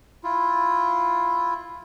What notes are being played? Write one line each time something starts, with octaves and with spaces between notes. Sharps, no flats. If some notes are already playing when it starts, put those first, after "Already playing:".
E4 F4